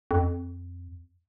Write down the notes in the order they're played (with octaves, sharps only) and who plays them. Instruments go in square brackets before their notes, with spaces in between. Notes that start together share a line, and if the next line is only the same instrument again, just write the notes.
[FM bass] F2